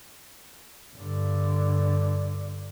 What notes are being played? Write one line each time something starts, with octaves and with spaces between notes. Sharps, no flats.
G2 D3